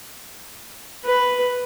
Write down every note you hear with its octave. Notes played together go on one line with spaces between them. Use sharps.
B4